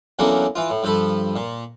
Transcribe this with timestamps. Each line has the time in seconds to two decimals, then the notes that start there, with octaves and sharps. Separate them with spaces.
0.19 E2 D3 F#3 A#3 C#4
0.55 E3 F4
0.70 A2
0.83 G2 F3 A4 B5
1.36 A#2